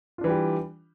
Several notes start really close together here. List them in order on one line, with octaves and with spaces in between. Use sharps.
F4 D4 E3 G3 G4